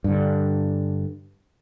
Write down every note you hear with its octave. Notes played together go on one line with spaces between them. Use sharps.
G2 D3